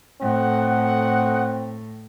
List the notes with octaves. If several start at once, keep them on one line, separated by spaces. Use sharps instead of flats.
A2 C4 A4 D#5 F#5